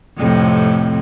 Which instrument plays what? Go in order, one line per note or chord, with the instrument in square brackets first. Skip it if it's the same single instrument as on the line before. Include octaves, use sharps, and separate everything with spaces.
[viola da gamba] F2 A2 C3